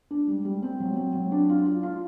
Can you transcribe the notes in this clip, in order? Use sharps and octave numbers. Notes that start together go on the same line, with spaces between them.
D4
G3
G3
C4
F#3
C4
F#3
D4
F4
F4
F4